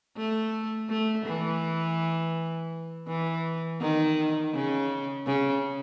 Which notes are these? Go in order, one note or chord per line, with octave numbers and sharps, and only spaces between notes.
A3
A3
E3
E3
D#3
C#3
C#3